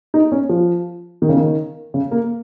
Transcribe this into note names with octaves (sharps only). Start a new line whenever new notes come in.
D#4
C#4
F3
D#3
C#3
D#3
C#3
A#3